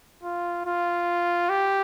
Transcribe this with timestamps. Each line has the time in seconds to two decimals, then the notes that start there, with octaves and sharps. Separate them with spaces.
0.23 F4
0.65 F4
1.49 G4